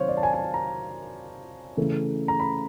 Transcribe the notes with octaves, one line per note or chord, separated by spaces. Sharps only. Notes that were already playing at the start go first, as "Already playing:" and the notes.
Already playing: C3 D#3 F#3 C5 C#5 F5
D5
A5
G#5
G#5
A5
A#5
C#3 E3 A3
A#5
B5